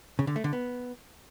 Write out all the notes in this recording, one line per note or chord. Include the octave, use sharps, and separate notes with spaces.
C#3
D3
A3
D3
B3